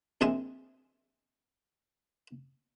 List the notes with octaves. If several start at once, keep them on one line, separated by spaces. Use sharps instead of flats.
A#1 C3 G#3 E5 G#5